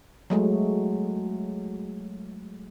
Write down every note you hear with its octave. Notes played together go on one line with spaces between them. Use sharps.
F#3 G#3 A3